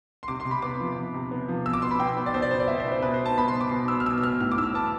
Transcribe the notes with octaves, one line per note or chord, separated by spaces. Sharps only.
C6
C3 D6
C6
C3
B5
B3 D6
F3
C3
C3
B3
F3
B2 E6
D6
B3 C6
B5
B2 G5
B3
D5
B2 C5
D5
B3 C5
D5
B2 E5
C5
B3
C5
B2 B4
C5
B3
A5
B2 B5
C6
B3
D6
B2
B3 E6
F6
B2 E6
E6
B3 F6
A2 F6
D6
A2 E6
F6
B3 A5